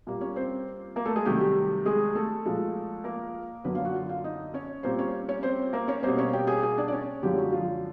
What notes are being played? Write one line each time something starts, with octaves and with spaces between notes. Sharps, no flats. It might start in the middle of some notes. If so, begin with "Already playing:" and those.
A#2 G3 A#3
C#4 C#5
C4 C5
A#3 A#4
A3 A4
G#3 G#4
C3 D#3 F#3 G3 A3 G4
G3 G4
G#3 G#4
A3 A4
A#2 F3 G#3
A#3 A#4
F#2 D3 F#3 A#3 B3 B4
F4 F5
F#4 F#5
F4 F5
F4 F5
D#4 D#5
C#4 C#5
A#2 G3 A#3 C4 C5
C#4 C#5
C#4 C#5
C4 C5
A#3 A#4
C#4 C#5
B2 G3 A#3 C4 C5
C#4 C#5
G4 G5
G#4 G#5
G#4 G#5
D4 D5
D5
C#4 C#5
F#2 D3 F3 G3 G#3 G4
F#3 F#4
F3 F4